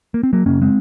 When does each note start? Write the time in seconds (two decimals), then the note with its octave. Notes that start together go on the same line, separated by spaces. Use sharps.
0.14 A#3
0.23 C4
0.33 F#3 A#3
0.46 F#2 C#3 A#3 C#4
0.62 G#3 C4